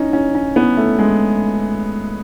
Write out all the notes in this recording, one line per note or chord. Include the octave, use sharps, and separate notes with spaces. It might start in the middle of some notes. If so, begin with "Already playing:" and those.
Already playing: C#4 D#4
C#4
C#4
B3
A3
G#3